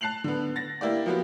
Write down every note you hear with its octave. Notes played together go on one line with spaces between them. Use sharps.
A5 F#6 C7 F7 F#7
D3 B3
A6 A#6
A#3 E4 G4 D5
F3 F#3 A#3 B3 F#4 G4